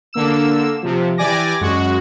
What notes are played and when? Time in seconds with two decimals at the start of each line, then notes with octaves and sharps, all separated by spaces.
0.13 D3 A#3 E6 E7
0.83 C3 F3
1.18 E3 G4 D5 G#5 D6 A#6
1.61 F#2 G#3 F#4